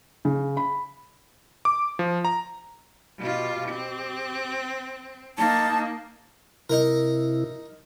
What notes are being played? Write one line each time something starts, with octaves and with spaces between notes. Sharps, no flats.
C#3
B5
D6
F3
A#5
B2 F4 G4
C4
A#3 D#4 A5
C3 D#4 E4 A#4